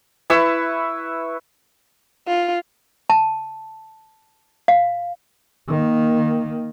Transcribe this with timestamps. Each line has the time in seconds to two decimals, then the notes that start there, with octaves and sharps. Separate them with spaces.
0.30 E4 B4 C#6 E6
2.28 F4
3.10 A5
4.68 F5
5.68 D#3 A#3